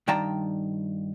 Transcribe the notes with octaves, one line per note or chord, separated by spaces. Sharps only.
G2 D#3 D5 G5 A5 A#5